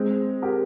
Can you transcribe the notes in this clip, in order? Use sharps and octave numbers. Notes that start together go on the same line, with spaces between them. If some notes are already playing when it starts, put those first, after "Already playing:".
Already playing: G#3 C4
G4 A#4